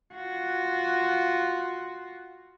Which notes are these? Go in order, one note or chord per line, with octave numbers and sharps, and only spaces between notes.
F4 F#4